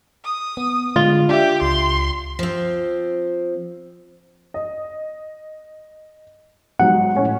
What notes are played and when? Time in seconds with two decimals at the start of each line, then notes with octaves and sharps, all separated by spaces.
0.24 D#6
0.57 B3
0.96 D3 G#3 F4
1.29 D4 G4 E5
1.62 C#2 C6
2.39 F3 C4
4.54 D#5
6.80 G#2 F#3 F#5
7.15 A2 C#4